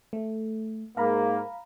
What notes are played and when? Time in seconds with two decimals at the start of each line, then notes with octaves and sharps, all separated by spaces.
0.13 A3
0.97 G#2 A#3 F5 A#5 B5